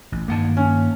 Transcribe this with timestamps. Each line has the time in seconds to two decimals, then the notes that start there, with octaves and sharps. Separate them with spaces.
0.12 A1
0.28 G2 D#3 A#3 F#5 A5
0.57 C#4